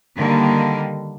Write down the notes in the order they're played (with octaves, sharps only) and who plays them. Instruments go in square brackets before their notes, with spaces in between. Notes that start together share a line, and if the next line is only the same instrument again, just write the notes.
[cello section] D3 D#3 G3 A#3